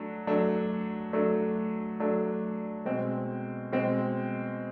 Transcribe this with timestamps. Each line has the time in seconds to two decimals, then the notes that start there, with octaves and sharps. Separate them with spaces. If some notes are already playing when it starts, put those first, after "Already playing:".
Already playing: F#3 A3 D4
0.27 F#3 A3 D4
1.13 F#3 A3 D4
2.00 F#3 A3 D4
2.85 B2 G#3 C4
3.72 B2 G#3 C4